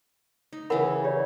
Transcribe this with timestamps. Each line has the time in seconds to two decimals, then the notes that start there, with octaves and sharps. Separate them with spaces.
0.53 D#4
0.70 C#3 E3 A#4 F#5 B5
1.04 G4 C#5 D5